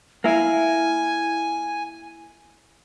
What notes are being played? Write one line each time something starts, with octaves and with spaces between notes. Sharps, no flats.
A#3 E4 G#5